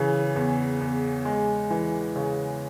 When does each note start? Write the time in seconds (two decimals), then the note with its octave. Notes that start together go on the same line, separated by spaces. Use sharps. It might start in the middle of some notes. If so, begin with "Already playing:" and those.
Already playing: C#3 E3
0.35 E2
0.80 E2
1.25 G#3
1.70 E3
2.16 C#3